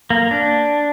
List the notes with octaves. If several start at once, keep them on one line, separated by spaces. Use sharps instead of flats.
A#3
D4